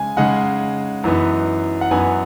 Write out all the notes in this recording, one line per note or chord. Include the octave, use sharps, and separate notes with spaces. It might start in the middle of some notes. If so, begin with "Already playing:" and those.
Already playing: C#3 G#3 G#5
C#3 G#3 D#4 F#5
F#2 E3 B3 D#4
F#5
F#2 E3 B3 D#4 G#5